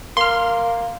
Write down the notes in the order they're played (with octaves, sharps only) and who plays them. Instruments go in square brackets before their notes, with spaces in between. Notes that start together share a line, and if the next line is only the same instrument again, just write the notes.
[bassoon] A#3 [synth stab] C6 F6